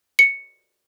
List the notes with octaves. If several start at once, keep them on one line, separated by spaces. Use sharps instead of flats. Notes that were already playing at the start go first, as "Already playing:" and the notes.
C#7